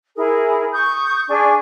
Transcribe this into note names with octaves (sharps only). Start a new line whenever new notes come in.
E4 G#4 A#4
C#6 D#6 G6
D4 G#4 G#5 C#6